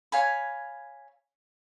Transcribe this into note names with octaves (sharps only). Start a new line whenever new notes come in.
C#5 F5 G#5 B5